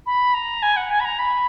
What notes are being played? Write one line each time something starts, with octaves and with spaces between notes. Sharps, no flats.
B5
A#5
G#5
F#5
G#5
B5
A#5
B5